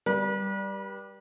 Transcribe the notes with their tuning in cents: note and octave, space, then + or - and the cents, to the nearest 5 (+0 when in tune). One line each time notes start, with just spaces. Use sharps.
G3 +0 B4 -40